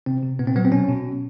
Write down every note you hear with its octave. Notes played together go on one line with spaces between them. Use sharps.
C3 C4
C3
A#2 B3
C4
F#3 B3
C4
B2 C#4
B2